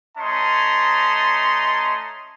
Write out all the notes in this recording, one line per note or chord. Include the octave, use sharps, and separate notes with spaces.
A3 C#4 D#5 A5 A#5 C6